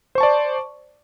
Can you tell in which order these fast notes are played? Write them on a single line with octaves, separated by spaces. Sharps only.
C5 C#6 A5 D5